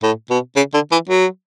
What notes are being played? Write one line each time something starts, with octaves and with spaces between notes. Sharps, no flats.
A2
B2
C#3
D3
E3
F#3